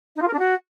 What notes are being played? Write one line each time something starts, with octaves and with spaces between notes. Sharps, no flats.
D#4
F4
A#4
D4
F#4